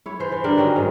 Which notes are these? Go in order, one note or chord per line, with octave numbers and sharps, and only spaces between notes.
E4 C#5
E3 C5
E3
D3 G3 D4 A#4
D#3 C#4 F#4 D#5
G#2 D#3 G#3